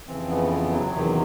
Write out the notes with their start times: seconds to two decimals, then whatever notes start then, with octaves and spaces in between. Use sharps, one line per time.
0.08 F2 C#3 E3 C4
0.30 B3
0.51 B3
0.72 F#3
0.93 E2 C3 D#3 F#3